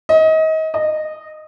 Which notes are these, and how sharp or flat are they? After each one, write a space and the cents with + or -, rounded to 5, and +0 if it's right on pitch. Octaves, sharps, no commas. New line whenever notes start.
D#5 +30
D#5 -15